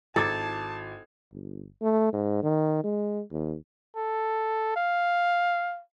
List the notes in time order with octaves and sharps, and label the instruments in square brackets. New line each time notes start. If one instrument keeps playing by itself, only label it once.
[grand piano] G#1 D6 G#6 [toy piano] E4 [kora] A4 [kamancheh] A5
[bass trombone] G1
A3
G#2
D#3
G#3
D#2
[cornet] A4
F5